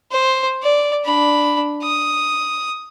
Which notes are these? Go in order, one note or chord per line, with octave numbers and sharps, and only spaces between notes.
C5
D5
D4 B5
D#6